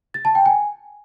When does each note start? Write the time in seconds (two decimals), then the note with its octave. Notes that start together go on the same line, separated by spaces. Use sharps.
0.14 A6
0.25 A5
0.35 G5
0.46 G#5